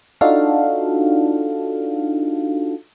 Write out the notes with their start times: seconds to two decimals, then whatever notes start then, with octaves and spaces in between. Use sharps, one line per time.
0.21 D4 D#4 F4 F#4 A4 F5